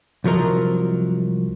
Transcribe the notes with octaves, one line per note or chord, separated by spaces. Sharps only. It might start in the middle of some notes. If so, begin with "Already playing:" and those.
C2 F3 F#3 A#4 D#5